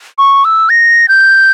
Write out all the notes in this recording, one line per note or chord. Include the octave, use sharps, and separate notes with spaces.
C#6
E6
A#6
G6